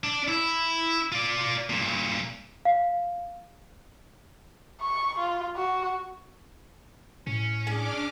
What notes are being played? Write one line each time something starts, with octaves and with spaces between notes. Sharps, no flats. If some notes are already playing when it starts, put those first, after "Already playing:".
D4
E4
F4 D5
G2 A#2
F5
C#6
F4
F#4
A2 C#4
D4 G#4 D6 F6